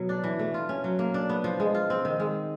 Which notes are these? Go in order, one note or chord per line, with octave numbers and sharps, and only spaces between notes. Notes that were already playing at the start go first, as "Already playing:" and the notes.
Already playing: B2 F#3 B3
D4
E3
A3
F4
C#4
F#3
A#3
D4
B3
F3
G#3
F4
C4
D#3
G#3